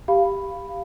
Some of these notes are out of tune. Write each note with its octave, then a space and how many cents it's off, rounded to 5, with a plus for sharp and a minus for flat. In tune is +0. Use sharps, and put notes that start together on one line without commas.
G4 +0 F5 -10 B5 +5